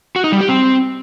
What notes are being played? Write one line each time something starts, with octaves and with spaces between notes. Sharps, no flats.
F#4
D#4
G3
G4
C4